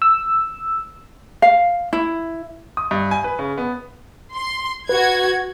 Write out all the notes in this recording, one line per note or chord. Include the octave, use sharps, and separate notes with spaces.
E6
F5
E4
D#6
G2
G#5
B4
C#3
B3
C6
F#4 B4 G#6